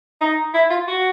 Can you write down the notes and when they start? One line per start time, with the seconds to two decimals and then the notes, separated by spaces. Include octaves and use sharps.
0.21 D#4
0.54 E4
0.70 F4
0.87 F#4